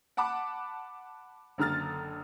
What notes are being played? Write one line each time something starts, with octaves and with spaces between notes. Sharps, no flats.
F#5 A5 B5 D6
F#1 D3 A#5 F6 A6